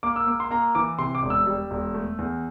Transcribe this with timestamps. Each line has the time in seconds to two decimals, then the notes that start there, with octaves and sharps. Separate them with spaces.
0.03 A#3 D6
0.16 E6
0.27 A#3 D6
0.40 C6
0.51 A#3 A#5
0.75 E3 D6
0.98 C3 C6
1.15 D6
1.23 E1
1.30 E6
1.47 G3
1.71 E1
1.94 A3
2.19 E2